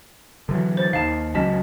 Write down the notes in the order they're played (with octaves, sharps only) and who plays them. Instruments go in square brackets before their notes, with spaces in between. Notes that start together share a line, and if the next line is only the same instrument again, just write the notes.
[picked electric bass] D3 E3 F#3
[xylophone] C5 A6
[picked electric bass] D#2 D#3 [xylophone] F5 A5
[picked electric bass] C#2 F#3 C#4 [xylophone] D#5 A5 B6